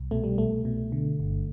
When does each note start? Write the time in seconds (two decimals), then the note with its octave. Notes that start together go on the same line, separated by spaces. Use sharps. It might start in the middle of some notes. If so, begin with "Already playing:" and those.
Already playing: C2
0.11 B2 A3
0.24 G3
0.38 C2 A3
0.65 B2
0.92 D3
1.20 G1